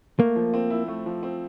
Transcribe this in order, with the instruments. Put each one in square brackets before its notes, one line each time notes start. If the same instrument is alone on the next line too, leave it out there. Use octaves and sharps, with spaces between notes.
[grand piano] A3 [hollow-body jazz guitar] A#3
[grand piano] F3
C4
E4
A3
F3
C4